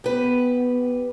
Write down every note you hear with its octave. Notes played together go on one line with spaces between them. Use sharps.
B3 G4 B4